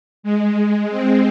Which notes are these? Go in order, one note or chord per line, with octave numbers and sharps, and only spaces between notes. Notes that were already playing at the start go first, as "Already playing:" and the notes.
G#3
C4